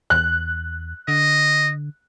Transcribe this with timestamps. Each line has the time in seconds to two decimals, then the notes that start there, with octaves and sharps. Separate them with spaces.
0.10 E2 F#6
1.08 D3 D#5